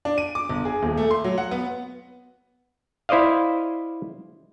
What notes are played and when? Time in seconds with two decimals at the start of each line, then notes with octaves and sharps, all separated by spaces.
0.05 D4
0.18 D#7
0.35 D6
0.49 G1
0.65 G#4
0.83 D#1
0.97 A3
1.11 C6
1.24 F#3
1.38 F#5
1.51 B3
3.09 E4 C5 D5 D#5 F5